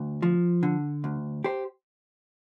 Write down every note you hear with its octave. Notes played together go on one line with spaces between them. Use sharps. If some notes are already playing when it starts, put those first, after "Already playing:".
Already playing: D2
F3
D3
D2
G4 C5